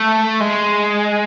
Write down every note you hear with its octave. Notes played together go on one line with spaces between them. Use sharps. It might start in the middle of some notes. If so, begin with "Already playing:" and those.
Already playing: A3
G#3